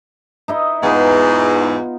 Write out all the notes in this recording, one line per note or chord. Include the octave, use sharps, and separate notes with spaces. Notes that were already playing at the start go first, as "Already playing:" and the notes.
D#4 E4 D#5
E2 G#2 B3 F4